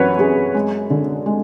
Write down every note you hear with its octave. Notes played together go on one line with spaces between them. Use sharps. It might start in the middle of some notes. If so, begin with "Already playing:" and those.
Already playing: F#2 E3 B4 C#5 F#5
F#2 G#4
G#3
D3
G#3